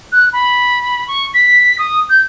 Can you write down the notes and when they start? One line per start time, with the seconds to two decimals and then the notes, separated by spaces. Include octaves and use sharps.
0.12 F#6
0.33 B5
1.08 C#6
1.34 B6
1.79 D#6
2.10 G6